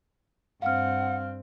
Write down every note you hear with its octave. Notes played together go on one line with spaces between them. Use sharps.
G2 C4 F5 F#5 F6